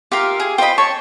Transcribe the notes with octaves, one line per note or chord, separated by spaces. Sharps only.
F4 G4 A#4 E5 F5
G#4
F4 C5 D#5 G5 B5
C#5 A5 C#6